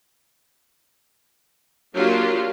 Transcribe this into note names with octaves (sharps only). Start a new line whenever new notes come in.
F#3 A#3 D4 F4 G4